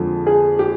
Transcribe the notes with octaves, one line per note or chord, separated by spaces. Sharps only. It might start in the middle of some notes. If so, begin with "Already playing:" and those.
Already playing: F2 D3 F3 G#3
G#4
G4